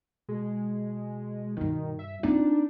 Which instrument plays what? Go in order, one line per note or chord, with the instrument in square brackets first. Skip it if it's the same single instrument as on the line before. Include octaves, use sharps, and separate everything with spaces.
[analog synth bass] B2 [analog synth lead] G#3
[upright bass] G2 E4 [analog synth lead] D#3
[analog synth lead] E5
[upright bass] C4 F4 [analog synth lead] D4 [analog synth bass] D#4